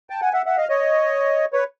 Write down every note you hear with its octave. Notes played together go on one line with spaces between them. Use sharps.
G5 A5
F#5 G#5
E5 F#5
E5 F#5
D#5 F5
C#5 D#5
B4 C#5